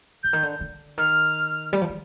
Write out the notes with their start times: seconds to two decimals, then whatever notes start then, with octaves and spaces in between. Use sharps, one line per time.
0.23 D3 G6
0.33 D#3
0.43 D3
0.61 D3
0.98 D#3 F6
1.73 G3
1.81 F3
1.89 D#3